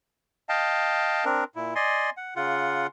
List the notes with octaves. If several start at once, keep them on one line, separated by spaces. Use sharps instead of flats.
D#5 F5 G5 A5
C4 D4 A#4
A#2 E4
D5 D#5 G#5 C6
F#5
C#3 F4 F#5